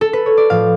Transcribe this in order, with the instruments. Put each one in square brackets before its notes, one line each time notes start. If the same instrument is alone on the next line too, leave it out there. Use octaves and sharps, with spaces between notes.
[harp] A4
B4
C#5
D5
A2 F3 F5